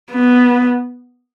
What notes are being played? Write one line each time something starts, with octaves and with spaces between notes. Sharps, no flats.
B3